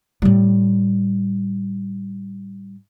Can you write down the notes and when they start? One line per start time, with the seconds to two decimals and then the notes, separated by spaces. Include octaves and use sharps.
0.22 A2 G3